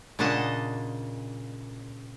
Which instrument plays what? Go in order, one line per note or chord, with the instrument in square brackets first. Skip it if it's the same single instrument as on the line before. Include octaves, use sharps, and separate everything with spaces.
[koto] A#2 C#3 D4 D#5 F#5 A5